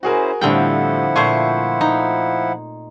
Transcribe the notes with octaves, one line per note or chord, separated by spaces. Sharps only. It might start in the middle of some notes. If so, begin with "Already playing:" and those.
C#4 E4 F#4 G#4 A#4 C5
A2 D3 F3 G3 C4 E4 F#5 G5
A#2 A3 C5 C6 C#6 G#6
D#4